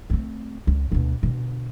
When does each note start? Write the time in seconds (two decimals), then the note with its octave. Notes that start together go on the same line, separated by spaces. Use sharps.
0.10 A3 C4
0.67 C#2
0.92 D2 B2
1.23 B2 D3